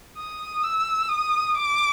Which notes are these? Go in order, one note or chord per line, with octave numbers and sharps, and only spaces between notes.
D#6
E6
D#6
D6